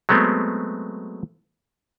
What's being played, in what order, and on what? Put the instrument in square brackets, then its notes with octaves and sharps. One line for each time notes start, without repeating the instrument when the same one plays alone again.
[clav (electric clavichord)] F#3 G#3 A3 B3 C4